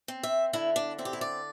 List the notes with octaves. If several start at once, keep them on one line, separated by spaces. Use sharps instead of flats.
C4
E5
D3 E4
D4
C4 E4
G4
E4
D5